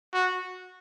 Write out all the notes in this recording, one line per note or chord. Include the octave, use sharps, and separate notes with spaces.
F#4